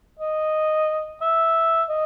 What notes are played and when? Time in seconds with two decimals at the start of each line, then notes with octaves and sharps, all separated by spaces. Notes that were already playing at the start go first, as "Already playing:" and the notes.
0.19 D#5
1.21 E5
1.89 D#5